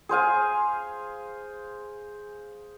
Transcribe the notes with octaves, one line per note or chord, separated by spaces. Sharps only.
G#4 C5 F5 G#5